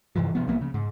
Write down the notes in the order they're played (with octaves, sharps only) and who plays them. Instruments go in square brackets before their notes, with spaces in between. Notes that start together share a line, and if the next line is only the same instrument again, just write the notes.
[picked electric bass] G2 C3 E3 F3
C3 F3 B3
C2 F3 A#3 B3
C#3
G#2